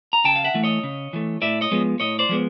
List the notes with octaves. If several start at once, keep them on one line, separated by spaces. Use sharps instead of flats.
A#5
C#3 G5 A5
F5
E5 F#5
E3 A3
C#5 D#5
C#3
E3 A3
A2 D5 E5
C#5 D#5
F3 G#3 B3
A2 C#5 D#5
C5 D5
F3 G#3 B3